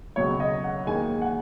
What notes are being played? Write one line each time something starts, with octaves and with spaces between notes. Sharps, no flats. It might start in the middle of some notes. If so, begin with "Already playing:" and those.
C#2 B2 F#3 C#5
D#5
F#5
D#2 D#3 G#3 G#5
F#5